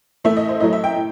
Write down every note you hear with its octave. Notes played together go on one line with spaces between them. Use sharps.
A2 E3 A3 E5
D#5
C5
A2 F#3 A3 D#5
E5
G5
A2